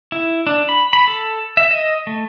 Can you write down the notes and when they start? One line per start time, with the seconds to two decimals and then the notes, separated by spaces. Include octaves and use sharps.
0.12 E4
0.47 D4
0.69 B5
0.93 B5
1.08 A4
1.57 E5
1.71 D#5
2.07 A3